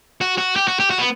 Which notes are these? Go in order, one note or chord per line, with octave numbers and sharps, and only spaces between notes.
F#4
F#4
G4
F#4
G4
F#4
B3